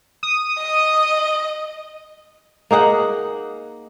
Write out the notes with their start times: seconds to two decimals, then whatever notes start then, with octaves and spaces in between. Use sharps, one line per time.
0.23 D#6
0.58 D#5
2.71 A#3 D#4 G#4 F#5